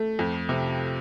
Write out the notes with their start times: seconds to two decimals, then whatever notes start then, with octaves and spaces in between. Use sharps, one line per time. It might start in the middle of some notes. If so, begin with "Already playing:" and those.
Already playing: A3
0.19 F2
0.49 C3